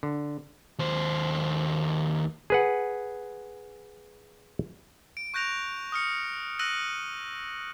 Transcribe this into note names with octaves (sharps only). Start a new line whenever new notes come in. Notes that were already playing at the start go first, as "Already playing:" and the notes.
D3
D#2 C5
G#4 B4 F#5
D7
C#6 F#6 G6 A#6 D7 F7
D#6 F6 C#7
E6 F#6 A#6 D#7 F#7